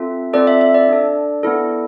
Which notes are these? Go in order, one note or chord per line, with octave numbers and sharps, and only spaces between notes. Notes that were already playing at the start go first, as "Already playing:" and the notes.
Already playing: C4 F4 A4 E5
C4 F4 A4 D5
E5
E5
D5
D4 A4
B3 E4 A4